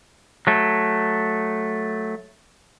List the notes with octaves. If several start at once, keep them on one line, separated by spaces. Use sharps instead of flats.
F#3 A3